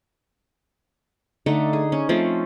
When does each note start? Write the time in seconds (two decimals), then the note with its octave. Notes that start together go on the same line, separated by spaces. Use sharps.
1.46 D3 A3 D#4 A4
1.73 G#4
1.92 C#4
2.09 F3 A3 C4 C#4